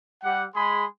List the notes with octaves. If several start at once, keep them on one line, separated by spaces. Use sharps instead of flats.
G3 G4 F#5
G#3 G#4 B5 C6 D#6